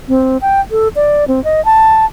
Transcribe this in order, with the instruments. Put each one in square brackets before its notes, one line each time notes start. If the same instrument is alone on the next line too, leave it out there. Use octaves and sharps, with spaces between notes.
[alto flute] C4
G5
A4
D5
C4
D#5
A5